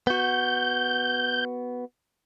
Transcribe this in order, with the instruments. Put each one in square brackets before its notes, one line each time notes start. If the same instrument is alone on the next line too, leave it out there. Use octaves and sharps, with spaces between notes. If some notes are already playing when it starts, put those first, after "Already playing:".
[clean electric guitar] B3 F#4 [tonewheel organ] G6